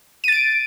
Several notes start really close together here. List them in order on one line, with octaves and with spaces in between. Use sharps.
D#7 A6 D7